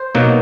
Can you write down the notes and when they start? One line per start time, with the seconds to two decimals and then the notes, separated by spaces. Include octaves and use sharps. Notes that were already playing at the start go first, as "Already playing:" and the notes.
Already playing: C5
0.15 B2 F#3 A#3 D#4